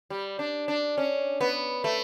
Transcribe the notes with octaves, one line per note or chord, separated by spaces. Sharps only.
G3
D4
D4
C#4
B3
A3